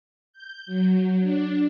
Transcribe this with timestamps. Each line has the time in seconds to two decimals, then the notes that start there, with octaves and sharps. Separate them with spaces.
0.33 G6
0.66 F#3
1.21 D4